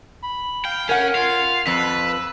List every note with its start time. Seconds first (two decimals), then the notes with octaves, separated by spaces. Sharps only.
0.23 B5
0.65 F5 G5
0.89 C#4 A#4 F#5
1.15 F4 F5
1.67 F2 B4 E6